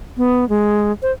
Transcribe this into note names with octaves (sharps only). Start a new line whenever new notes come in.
B3
G#3
C5